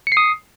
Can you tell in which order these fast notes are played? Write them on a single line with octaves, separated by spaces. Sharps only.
C#7 C7 D#6